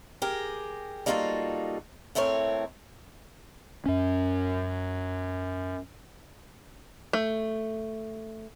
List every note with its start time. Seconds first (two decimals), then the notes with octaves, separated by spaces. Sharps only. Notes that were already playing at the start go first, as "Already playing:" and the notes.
0.22 G4 G#4 A#4
1.06 G3 A#3 D#4 F4 F#4 A4
2.15 A2 A3 C4 A#4 C#5
3.86 F#2 C#4
7.13 A3